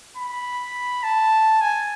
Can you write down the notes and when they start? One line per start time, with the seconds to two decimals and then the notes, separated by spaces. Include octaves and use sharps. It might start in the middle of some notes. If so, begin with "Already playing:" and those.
0.17 B5
1.03 A5
1.61 G#5